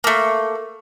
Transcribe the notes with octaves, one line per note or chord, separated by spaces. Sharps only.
A3 A#3